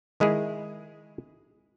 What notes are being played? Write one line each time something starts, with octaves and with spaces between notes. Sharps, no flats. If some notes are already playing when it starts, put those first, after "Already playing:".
D#3 G#3 E4 G#4